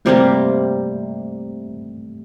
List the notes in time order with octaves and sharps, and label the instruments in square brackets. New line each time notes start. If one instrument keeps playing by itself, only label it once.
[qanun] C3 G3 A#3 [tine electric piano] A3